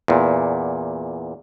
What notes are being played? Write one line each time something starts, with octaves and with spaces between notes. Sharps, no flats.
E2 A#2